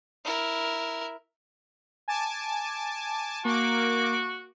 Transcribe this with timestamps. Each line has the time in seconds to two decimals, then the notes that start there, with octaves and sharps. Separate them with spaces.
0.25 E4 A#4
2.08 G#5 A5 D6
3.45 A#3 F#4 D6